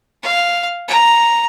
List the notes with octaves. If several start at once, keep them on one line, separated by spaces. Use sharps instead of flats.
F5
A#5